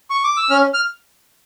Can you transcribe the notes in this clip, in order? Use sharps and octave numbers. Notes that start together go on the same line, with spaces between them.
C#6
D6
E6
C#4 F6
F6